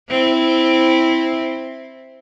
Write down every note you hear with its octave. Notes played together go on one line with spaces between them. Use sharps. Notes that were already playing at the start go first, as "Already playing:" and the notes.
C4 E4